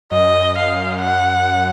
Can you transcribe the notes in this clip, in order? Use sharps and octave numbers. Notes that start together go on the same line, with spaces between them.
F#2 D#5
F5
F#5